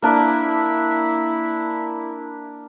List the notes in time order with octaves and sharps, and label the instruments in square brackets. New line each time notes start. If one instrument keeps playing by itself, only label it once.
[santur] A#3 D4 A#4 [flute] E4